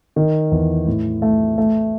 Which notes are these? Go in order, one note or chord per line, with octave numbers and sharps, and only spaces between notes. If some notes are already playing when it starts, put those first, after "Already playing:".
D#3
E2
A2
A3
A3